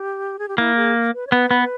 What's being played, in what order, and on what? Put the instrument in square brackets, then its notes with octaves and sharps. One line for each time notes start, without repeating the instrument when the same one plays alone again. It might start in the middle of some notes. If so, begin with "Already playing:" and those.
Already playing: [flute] G4
G#4
G4
[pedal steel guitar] A#3 [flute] E4
[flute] G#4
B4
C#5
[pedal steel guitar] B3 [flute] B4
[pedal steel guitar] B3